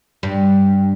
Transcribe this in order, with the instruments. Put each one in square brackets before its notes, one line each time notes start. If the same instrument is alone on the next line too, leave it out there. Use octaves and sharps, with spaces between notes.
[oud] G2